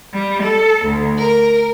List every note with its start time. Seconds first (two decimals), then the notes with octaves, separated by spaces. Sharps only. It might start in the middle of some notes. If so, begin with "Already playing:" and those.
0.13 G3
0.44 A4
0.85 D2
1.16 A#4